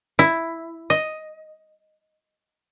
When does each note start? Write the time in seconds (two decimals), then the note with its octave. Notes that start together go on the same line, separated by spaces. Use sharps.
0.19 E4
0.90 D#5